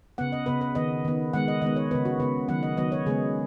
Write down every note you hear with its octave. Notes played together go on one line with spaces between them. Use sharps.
C#3 B3 F#5
D#5
C#3 B3 B4
B4
D#3 B3 D#5
D#3 B3
D#3 G#3 B3 F#5
D#5
D#3 G#3 B3 D#5
C#5
C#3 B3 B4
F#4
C#3 B3 B4
D#3 F#3 B3 F#5
D#5
D#3 F#3 B3 D#5
C#5
C#3 G#3 B3 G#4